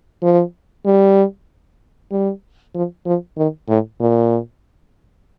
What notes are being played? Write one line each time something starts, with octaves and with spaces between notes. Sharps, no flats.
F3
G3
G3
F3
F3
D#3
A2
A#2